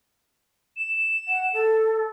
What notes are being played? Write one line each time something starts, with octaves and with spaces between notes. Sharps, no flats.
E7
F#5
A4